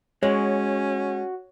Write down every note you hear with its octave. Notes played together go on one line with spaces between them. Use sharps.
G#3 C#4 F#4 C#5